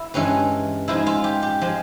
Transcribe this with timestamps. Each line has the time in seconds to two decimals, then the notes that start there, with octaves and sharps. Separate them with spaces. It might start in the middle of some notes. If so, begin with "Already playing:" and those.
Already playing: E4
0.14 G2 E3 G#3 C#4
0.88 G#2 F3 G#3 E4
1.07 F4
1.24 G4
1.43 G4
1.61 F3 G#3